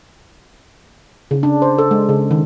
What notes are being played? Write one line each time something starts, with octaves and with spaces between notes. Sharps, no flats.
C#3
D4
C5
A4
G#3
C#3
D#3